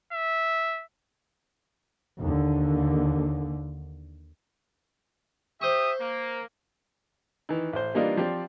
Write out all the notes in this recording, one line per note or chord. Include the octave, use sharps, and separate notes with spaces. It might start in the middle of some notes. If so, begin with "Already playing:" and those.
E5
D#2 D3
G4 C5 E5 C#6 D#6
A#3
D#3 E3
A1 C5
E3 G3 A#3 D4 D#4 F4
F3 C4 G4 D5